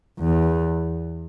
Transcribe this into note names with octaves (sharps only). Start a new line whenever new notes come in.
E2